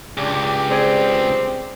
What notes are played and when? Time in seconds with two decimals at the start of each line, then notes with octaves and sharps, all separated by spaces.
0.18 C#2 D4 G4
0.71 C4 G#4 D5